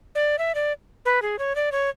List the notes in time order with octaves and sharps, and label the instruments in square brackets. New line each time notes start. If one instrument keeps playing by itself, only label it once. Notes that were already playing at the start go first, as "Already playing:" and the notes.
[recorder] D5
E5
D5
B4
G#4
C#5
D5
C#5